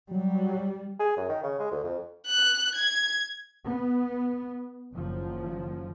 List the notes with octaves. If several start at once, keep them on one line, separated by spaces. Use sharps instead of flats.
F#3 G3
G#4
F#2
D#3
C#3
G#3
D2
F2
F#6
G#6
B3
F#1 D#3 F3 F#3